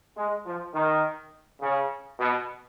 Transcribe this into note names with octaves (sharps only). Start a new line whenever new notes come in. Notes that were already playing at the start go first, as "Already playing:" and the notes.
G#3
F3
D#3
C#3
B2